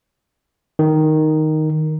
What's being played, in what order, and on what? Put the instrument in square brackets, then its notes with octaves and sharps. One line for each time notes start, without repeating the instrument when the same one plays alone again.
[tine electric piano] D#3